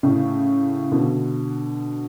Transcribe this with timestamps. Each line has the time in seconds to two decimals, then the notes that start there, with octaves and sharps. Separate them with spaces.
0.03 A2 C#3
0.91 B2 D3